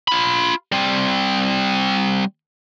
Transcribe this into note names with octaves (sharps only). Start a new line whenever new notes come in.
F4 B5
G3 C4